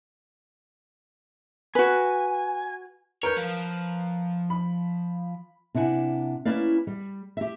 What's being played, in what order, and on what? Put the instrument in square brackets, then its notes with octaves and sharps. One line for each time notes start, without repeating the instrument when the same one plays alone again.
[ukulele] F#4 B4 [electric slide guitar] G#5
[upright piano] A#4 B4 G6 [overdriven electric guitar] C#5
[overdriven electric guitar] F3
[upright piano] B5
[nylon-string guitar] C3 D4 E4 F#5 G#5
A#3 C#4 E4 B4 D5 F5
G3
G4 E5